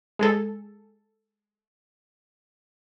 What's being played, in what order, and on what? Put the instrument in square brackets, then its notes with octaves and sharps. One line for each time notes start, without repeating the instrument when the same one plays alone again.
[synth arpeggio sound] G#3 G#4 A4